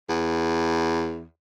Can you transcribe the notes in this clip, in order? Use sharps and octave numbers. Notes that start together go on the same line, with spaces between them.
E2